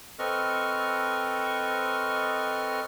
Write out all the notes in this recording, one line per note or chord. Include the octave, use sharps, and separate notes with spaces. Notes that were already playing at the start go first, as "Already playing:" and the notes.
C4 A4 B4 D#5 C#6 F6